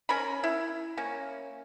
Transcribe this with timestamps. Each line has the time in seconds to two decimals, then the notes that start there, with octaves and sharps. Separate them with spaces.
0.09 C#4 A#4 B5
0.44 E4
0.97 A#3 C#4